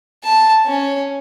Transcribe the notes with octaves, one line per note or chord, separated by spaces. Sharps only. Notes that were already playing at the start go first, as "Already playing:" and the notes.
A5
C#4